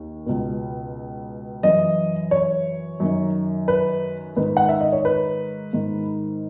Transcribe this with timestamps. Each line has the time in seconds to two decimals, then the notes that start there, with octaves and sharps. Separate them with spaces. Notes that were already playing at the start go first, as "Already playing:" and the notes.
Already playing: D#2
0.26 C#2 B2
1.63 F#2 E3 D#5
2.31 C#5
3.00 F#2 D#3
3.68 B4
4.36 G#2 D#3 B4
4.57 F#5
4.69 E5
4.81 D#5
4.92 C#5
5.05 B4
5.73 G#2 D#3